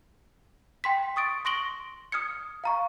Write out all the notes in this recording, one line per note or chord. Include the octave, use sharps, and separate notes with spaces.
G5 C6 B6
C#6 D#6 A6 D7
C6 C#6 A#6 D7 F#7 G7
D#6 F6 G#6 C#7
F5 A#5 C#6